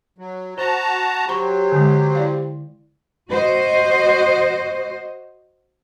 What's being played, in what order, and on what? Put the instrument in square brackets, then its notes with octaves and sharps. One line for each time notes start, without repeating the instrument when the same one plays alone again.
[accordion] F#3
[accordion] F#4 A5 A#5 [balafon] C5
[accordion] F#3 [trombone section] G4 C5 [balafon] A#5 B5 C#6
[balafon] D3 G#3
E4 D5 F5
[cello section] F#4 C5 D#5